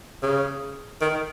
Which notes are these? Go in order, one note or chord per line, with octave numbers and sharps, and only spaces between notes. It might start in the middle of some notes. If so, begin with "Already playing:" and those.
C#3
D#3